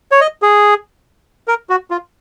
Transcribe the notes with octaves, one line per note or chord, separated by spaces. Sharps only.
C#5
D#5
G#4
A#4
F#4
F4